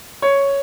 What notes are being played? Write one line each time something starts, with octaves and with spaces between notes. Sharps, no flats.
C#5